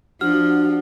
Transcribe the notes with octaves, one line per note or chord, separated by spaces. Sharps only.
F3 D4 F#4 F6